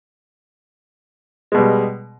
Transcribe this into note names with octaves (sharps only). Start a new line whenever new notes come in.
B2 G3 G#3